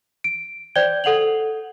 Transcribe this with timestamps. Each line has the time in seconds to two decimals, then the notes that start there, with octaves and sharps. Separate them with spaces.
0.24 D7
0.76 C5 D5 G5 G6 G#6 G7
1.04 A4 F#5 F7 F#7